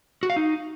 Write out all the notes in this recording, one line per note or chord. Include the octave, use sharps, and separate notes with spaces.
F#4
F5
D#4